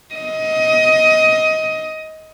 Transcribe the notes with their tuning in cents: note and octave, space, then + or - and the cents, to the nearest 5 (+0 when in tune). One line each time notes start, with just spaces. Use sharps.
D#5 +20